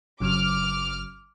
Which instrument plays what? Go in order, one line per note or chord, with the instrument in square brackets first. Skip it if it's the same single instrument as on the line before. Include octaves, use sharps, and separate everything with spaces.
[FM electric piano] G1 C#3 F#3 [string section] D6 F6